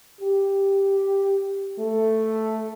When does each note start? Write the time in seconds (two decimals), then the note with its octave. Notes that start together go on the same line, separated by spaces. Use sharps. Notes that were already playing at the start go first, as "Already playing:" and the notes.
0.21 G4
1.79 A3